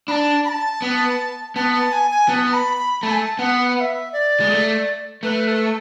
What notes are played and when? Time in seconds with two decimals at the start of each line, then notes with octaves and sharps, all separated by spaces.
0.08 D4 B5
0.12 A5
0.45 B5
0.49 A5
0.82 B3
1.56 B3 A5
1.73 A5
1.92 G#5
2.11 G#5
2.29 B3 A5
2.54 B5
2.78 B5
3.03 A3 A5
3.11 G#5
3.19 A5
3.39 B3 F#5
3.76 F#5
3.81 E5
4.13 D5
4.40 G#3
4.50 A3
5.23 A3 B4
5.48 A4